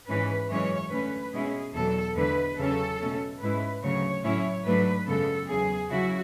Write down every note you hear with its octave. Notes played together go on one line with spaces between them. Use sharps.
G#2 E3 G#3 C#4 B4
F#2 E3 G#3 C#4 C#5
D3 A3 C#4 B4
B2 G#3 C#4 E4 G#4
E2 B2 F#3 A4
E2 D3 G#3 B4
E2 C#3 F#3 C#4 A4
B2 A3 C#4
G#2 G#3 C#4 E4 B4
D2 C#3 F#3 C#5
A2 F#3 C#4 E4 C#5
G#2 F#3 A3 D4 B4
F#2 C#3 G#3 B3 A4
E2 C#3 F#3 G#4
C#3 F#3 C#4 E4 F#4